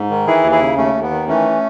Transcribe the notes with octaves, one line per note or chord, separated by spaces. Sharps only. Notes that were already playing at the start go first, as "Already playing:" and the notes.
Already playing: G#2
D#3
E3 E4 G#4
D#2
E4 G#4
C#3
D#2 A3 C#4
D#2
B3
D#3
E3 A3 C#4